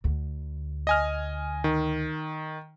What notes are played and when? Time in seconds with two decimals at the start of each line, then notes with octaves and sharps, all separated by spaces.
0.04 D2 D3
0.87 D#5 G#5 F6
1.64 D#3